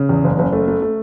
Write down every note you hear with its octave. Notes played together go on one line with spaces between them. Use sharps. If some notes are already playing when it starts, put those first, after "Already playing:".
Already playing: C#3
E2
F#1
F#1
A3
A3
A3